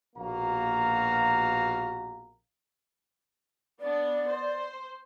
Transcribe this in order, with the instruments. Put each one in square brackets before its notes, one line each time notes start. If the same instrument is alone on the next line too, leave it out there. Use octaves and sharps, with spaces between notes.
[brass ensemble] A#1 B2 A#3 F#4 F5 A#5
[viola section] B3 D4 [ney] D5
[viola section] C5